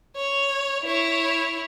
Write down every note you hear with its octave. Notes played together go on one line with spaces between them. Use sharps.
C#5
E4 C#5